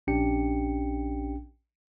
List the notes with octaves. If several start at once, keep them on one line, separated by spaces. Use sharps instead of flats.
A#1 C#4 D4 G4 G5 C#7